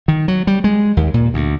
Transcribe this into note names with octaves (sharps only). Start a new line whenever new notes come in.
D#3
F#3
G3
G#3
D#2
A#2
D2